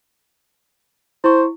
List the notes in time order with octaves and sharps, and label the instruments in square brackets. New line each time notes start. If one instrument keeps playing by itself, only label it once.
[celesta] E4 C#6 [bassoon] C5